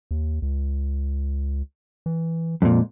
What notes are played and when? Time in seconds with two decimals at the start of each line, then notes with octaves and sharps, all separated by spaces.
0.11 D#2
0.42 C#2
2.06 E3
2.62 F2 A#2 G#3